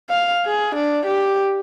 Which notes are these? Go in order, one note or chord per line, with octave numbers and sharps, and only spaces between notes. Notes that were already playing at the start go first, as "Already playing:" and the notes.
F5
G#4
D4
G4